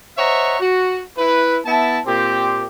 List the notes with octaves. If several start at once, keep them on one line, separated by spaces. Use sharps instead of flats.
C5 C#5 D#5 E5 F#5 A#5
F#4
E4 B4
B3 E4 E5 A5
A#2 C4 G4